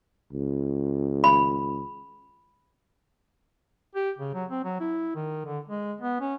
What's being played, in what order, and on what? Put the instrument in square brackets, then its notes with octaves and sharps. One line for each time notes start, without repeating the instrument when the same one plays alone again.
[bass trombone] C#2
[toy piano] B5
[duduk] G4
C#3
F#3
C4
F#3
E4
D#3
D3
G#3
B3
C#4